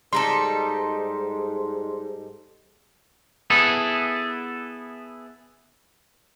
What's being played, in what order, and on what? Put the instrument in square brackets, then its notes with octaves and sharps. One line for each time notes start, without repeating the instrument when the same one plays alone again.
[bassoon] G#2 [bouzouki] G3 D#4 A4 [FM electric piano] C6
[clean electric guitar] B3 E4 G#4 A4